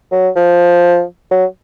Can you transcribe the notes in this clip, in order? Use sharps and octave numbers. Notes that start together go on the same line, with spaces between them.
F#3
F3
F#3